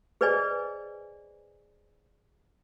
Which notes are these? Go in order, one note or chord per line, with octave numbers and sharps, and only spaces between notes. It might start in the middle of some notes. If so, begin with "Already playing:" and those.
G#4 B4 C5 D5 D#5 G#5